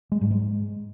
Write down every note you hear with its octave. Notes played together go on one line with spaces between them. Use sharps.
G#3
G#2 G3
G#3